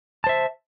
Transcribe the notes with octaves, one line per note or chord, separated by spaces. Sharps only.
C5 E5 A5